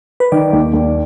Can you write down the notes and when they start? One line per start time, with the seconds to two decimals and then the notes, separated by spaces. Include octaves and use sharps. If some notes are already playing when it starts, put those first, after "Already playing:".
0.20 B4
0.32 D#3 D5
0.53 D#2
0.73 D#2